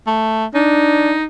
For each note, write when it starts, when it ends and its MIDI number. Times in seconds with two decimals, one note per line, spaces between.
0.07 0.45 57
0.54 1.15 62
0.54 1.25 63